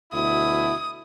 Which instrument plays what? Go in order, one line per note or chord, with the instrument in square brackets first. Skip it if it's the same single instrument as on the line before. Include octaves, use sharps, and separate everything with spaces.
[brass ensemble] D2 B2 E4 [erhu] D#6